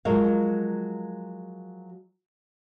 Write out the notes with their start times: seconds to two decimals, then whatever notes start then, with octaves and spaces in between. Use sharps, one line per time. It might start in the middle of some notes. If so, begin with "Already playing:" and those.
0.05 F3 F#3 G#3 A#4 F5